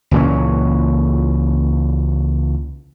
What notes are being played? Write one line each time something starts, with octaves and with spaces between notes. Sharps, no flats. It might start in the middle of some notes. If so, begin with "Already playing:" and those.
C#2 A#2 E3 C#4